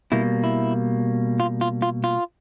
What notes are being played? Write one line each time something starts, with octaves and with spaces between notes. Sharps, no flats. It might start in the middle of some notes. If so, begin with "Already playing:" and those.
B2 G3 A#3 E4
E4
F4
F4
F4
F4